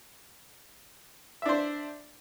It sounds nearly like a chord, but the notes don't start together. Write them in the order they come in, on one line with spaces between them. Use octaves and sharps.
E5 D4 C5